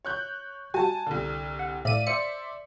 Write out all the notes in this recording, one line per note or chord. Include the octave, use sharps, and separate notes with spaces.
C#5 F#6 G6
G3 F#4 G#5 A5
C2 D3
F#5
A2 D5 E5 F5 D#7
C5 D5 E5 C#7